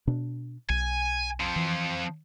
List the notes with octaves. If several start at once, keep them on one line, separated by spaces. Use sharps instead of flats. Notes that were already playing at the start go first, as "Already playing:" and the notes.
B2 D4
B1 G#5
F3 C4
E3